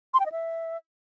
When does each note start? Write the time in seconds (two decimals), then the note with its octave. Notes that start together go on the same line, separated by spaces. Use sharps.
0.14 C6
0.20 G5
0.26 D#5
0.32 E5